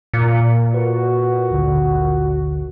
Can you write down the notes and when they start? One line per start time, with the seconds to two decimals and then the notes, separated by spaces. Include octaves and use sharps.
0.14 A#2 C#7
0.74 F#4 B4
1.50 G#1 D2 D3